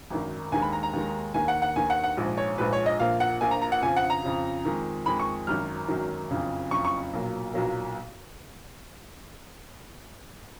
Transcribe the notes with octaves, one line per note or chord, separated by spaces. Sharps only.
G#1 F#2 D#3
D#2 D#3 G#3 G#5
B5
A#5
A#5
D#2 D#3 G#3
D#2 D#3 A#3 G#5
F#5
F#5
D#2 D#3 A#3 G#5
F#5
F#5
A#1 G#2 F3 G#3
C#5
A#1 G#2 F3 G#3 B4
C#5
D#5
A#1 A#2 F3 A#3 F5
F#5
A#1 A#2 F3 A#3 G#5
A#5
A#5
F#5
F2 C#3 F3 G#5
F#5
A#5
F2 C#3 F3
F2 D#3 G#3
F2 D#3 G#3 B5
C#6
G#1 F#2 D#3 F#3 F6
G#1 F#2 D#3 F#3
F#1 F2 C#3
F#1 F2 C#3 C#6
C#6
B1 A#2 F#3 A#3
B1 A#2 F#3 A#3